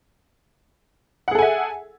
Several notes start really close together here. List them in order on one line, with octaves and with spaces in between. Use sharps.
F#5 G#4 A4 G#5 E5